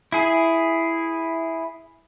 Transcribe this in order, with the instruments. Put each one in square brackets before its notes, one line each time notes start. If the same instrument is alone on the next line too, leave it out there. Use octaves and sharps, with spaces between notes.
[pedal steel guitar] E4 G#4